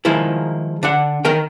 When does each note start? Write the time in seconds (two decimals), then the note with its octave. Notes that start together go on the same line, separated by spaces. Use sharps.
0.05 D#3 F3 G#3 A#3 E4 G#4
0.83 D3 D4 F#5
1.25 D#3 A#4 G5